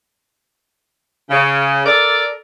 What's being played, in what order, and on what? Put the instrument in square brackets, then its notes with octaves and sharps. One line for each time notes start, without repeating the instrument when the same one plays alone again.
[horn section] C#3
A4 A#4 D5